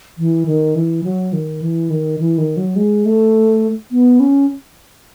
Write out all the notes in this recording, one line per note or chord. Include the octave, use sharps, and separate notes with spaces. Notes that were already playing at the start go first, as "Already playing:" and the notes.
E3
D#3
E3
F#3
D#3
E3
D#3
E3
D#3
F#3
G#3
A3
B3
C#4